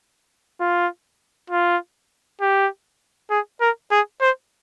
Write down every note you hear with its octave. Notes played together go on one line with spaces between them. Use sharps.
F4
F4
G4
G#4
A#4
G#4
C5